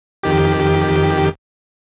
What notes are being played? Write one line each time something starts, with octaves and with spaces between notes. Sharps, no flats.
F2 D#3 G4